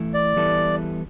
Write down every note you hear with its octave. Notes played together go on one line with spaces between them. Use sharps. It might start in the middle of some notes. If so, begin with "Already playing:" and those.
Already playing: E3 A3 E4
D5
E3 G3 B3 E4 A4